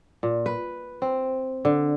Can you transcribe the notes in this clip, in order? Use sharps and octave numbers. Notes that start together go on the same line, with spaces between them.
A#2
B4
C4
D3